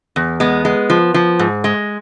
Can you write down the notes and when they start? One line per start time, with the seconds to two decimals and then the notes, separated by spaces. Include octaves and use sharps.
0.16 E2
0.40 G#3 B3
0.65 G#3
0.90 F3
1.14 F3
1.39 G#2
1.64 G#3